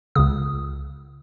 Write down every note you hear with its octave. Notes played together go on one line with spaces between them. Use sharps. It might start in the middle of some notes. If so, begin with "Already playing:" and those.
C#2 C#3 D#6